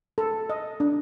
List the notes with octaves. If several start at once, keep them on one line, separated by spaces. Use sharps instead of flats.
A4
D#5
D4